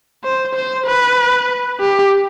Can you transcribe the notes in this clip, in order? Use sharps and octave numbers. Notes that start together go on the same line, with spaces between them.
C5
C5
B4
G4